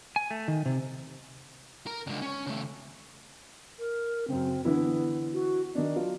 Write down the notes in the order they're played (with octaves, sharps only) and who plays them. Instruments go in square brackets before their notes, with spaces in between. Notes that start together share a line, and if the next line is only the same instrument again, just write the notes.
[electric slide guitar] G#5
A3
D#3
C3
[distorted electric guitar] A#4 A#5
C#2 D3
C#4
C#3 A3
[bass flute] A#4
[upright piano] F#2 C#3 [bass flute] C4
[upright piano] D3 E3 E4 [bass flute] B3
[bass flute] F#4
[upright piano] D#3 D4 [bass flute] D#5
[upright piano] F#3 D4 F4